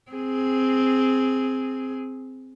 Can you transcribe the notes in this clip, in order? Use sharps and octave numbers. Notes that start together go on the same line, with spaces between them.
C4 G#4